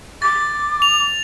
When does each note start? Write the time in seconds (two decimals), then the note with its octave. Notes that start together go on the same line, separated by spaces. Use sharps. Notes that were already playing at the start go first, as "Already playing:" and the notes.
0.22 D6 A6
0.82 F7